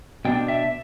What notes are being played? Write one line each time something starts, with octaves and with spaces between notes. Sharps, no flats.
B2 B3 D4 G5
E5